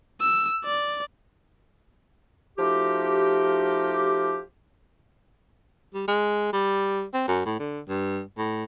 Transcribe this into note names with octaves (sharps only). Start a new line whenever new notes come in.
E6
D5
F3 A3 D#4 F#4 G4
G3
G#3
G3
C4
F#2
A2
D3
G2
A2